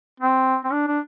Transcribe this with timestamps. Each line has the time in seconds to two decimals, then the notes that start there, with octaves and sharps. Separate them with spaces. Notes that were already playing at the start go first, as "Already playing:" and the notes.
0.20 C4
0.64 C4
0.72 D4
0.88 D4